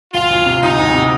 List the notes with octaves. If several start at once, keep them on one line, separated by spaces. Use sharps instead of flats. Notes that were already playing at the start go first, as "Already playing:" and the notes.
D2 F4
D2
C3
D2 D#4
D2
C3